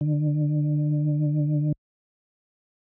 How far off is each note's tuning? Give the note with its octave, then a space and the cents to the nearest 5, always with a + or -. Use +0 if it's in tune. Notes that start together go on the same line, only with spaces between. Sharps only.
D3 +30